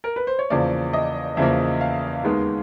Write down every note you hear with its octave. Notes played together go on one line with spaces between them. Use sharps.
A#4
B4
C5
C#5
E2 C#3 F3 A#3 D5
D#5
E2 C#3 F3 A#3 E5
F5
D#2 D#3 G#3 B3